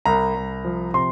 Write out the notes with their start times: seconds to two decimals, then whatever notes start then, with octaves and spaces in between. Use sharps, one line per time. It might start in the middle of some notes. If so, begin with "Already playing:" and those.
0.05 C2 A#5
0.35 C2
0.65 F3
0.94 C3 C6